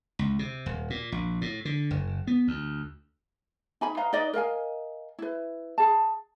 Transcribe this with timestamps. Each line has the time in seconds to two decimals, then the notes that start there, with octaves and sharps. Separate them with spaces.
0.19 C#2
0.39 C3
0.66 D#1
0.90 A#2
1.12 A#1
1.41 A2
1.65 D3
1.91 F#1
2.27 B3
2.47 D2
3.81 D#4 G#5 B5
3.97 B4 D#5 F5 A#5
4.13 D#4 B4 D5 D#5
4.33 A#4 D#5 F5 G#5
5.19 E4 B4
5.78 G#4 A5